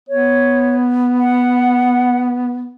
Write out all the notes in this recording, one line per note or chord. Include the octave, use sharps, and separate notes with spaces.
B3 C#5
F#5